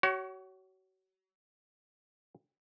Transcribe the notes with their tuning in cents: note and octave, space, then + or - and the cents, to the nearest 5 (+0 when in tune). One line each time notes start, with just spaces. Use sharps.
F#4 +35 C#5 +10